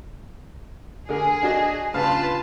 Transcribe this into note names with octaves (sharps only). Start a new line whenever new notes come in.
D3 G#4 A#4
D4 F#4 D#5
G2 C#3 F4 B4 F5 A5